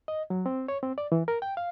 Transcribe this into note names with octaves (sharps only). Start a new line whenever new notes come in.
D#5
F#3
C4
C#5
C4
D5
E3
A#4
G5
F5